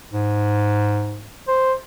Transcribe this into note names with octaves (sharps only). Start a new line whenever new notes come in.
G#2
C5